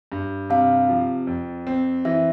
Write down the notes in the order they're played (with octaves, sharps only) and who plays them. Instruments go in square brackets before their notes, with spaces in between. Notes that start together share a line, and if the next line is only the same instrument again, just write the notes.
[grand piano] G2
[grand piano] C3 [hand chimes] F5
[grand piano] F3
F2
C4
[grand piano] E3 [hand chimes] E5